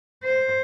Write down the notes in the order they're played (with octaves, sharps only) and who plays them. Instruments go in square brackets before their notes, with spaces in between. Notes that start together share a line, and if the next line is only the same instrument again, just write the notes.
[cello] C5